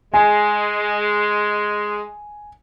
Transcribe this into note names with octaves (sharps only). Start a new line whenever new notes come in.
G#3 G#5